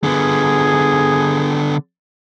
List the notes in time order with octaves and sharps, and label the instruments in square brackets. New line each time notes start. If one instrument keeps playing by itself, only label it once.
[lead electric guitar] D3 B3 [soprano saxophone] G#4